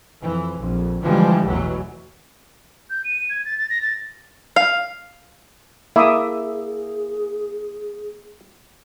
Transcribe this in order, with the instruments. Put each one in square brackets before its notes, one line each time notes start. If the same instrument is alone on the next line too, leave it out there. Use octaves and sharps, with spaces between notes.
[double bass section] F2 E3
A#1 F2
D3 E3 F3 G3 G#3
A1 E2 B2 E3 F#3
[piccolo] G6
D#7
G#6
A6
A6
A#6
A6
[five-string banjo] F5
[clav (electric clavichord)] A#3 E4 [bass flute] G#4 [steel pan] E5 D6 D#6